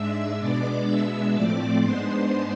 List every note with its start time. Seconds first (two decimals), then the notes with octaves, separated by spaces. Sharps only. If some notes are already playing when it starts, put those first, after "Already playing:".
Already playing: G#2 G#3 D4 E5 E6
0.39 B2 G#3 B3 D4 D5 D6
0.87 B2 G#3 B3 D4 E5 E6
1.34 A2 F3 A3 C4 D5 D6
1.81 G#2 G#3 B3 D4 C5 C6